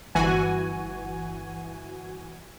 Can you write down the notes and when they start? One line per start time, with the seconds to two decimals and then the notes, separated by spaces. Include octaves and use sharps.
0.15 G1 E3 F#4 G#5